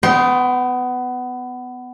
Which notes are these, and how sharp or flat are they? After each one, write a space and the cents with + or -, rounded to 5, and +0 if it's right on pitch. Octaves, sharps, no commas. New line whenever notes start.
B3 +20 G5 -25 C6 +30